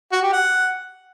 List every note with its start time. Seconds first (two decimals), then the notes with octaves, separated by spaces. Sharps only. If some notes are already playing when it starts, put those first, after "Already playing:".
0.12 F#4
0.22 G4
0.32 F#5